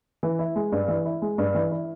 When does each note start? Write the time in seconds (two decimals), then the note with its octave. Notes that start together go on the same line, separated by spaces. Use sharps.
0.23 E3
0.39 E4
0.56 G#3
0.72 G2
0.88 E3
1.05 E4
1.22 G#3
1.38 G2
1.55 E3
1.72 E4